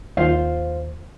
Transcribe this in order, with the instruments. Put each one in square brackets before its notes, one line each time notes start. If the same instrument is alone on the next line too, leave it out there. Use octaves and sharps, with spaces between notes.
[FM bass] D#2 [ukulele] F4 C5 F5